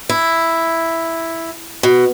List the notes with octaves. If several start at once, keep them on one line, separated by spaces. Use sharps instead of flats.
E4
B2